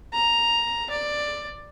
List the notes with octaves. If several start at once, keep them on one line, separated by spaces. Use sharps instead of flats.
A#5
D5